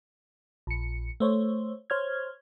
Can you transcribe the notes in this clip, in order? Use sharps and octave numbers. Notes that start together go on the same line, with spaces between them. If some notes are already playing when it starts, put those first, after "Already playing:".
A#1 C#7
A3 C5 C#5
C5 C#5 F6 G#6